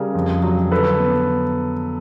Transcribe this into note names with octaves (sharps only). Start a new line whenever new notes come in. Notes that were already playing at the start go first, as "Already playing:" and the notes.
Already playing: C#3 G3 G#4 A#4
F2
F#3
D3 A4 B4
B3